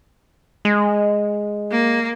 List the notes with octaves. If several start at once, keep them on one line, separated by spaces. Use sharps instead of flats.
G#3
A#3